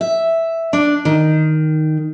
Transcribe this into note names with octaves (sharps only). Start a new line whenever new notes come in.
E5
D4
D#3